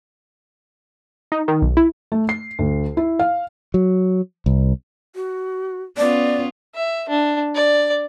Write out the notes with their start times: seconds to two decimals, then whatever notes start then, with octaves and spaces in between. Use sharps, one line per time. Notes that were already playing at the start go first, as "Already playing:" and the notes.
1.32 D#4
1.48 D#3
1.62 B1
1.77 E4
2.12 A3
2.29 C7
2.59 D2
2.97 E4
3.19 F5
3.74 F#3
4.46 C2
5.15 F#4
5.98 B3 C#4 F4 D5
6.75 E5
7.09 D4
7.55 D5